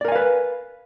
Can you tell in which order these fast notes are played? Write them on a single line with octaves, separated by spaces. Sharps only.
D5 A#4 G#5 F5 B4